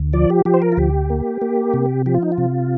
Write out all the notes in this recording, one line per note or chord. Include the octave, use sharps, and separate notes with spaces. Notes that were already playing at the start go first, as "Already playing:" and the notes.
Already playing: D2
F3 D5
G4
F3 G4
C5
A#4
F4
D2 G4
A#3
A#3
C3
F3 G4
F4
D#4
F4
C3